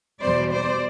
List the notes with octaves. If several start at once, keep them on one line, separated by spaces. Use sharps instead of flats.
E2 B2 G3 C5 D5
C5 D5